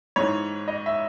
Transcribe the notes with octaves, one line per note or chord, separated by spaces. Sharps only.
G#2 E3 G#3 C#5
D#5
E5